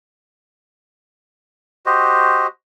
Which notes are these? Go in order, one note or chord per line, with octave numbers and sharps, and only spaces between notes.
F#4 G4 C5 D#5